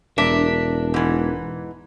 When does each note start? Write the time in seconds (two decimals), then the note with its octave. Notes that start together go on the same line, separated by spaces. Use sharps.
0.18 E1 D4 A#4 E5
0.94 G#2 E3